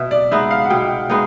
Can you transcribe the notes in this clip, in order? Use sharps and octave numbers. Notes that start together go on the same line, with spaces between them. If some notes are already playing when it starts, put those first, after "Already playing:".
Already playing: B2 E5
D5
G#3 B3 D#4 E5
F5
F#5
B2 G5
G#3 B3 D#4